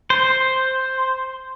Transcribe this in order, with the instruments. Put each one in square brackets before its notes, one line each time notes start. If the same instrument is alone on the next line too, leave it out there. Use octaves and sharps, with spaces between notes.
[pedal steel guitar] C5